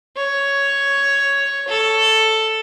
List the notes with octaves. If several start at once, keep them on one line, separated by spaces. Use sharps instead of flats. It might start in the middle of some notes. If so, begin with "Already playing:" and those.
C#5
A4